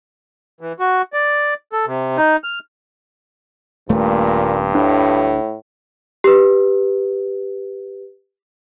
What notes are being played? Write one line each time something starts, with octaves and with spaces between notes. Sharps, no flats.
E3
F#4
D5
A4
C3
D#4
F6
D#1 G2 A#2 A3
D2 A2 D4
G4 B4